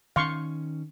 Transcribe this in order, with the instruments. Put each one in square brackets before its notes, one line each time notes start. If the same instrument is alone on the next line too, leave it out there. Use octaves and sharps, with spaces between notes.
[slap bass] D#3 C#4 [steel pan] F5 C6 C#6